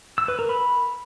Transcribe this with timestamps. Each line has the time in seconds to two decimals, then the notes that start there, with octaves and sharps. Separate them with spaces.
0.18 E6
0.28 B4
0.39 A#4
0.49 B5